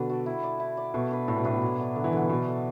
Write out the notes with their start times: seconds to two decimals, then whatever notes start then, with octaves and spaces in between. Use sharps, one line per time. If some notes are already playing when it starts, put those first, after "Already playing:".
Already playing: B2 D3 F#3 D4 B4
0.09 F#4 A4 D5
0.26 E4
0.43 D5
0.60 E4
0.77 D5
0.94 B2 A3
1.11 D4 B4
1.28 A2 A3
1.37 B2
1.45 A2 D4 B4
1.54 B2
1.62 F#3
1.78 B3 D4
1.96 D3 F#3
2.04 E3
2.13 D3 D4
2.17 B2 B3
2.29 B2 B3
2.46 D4 A4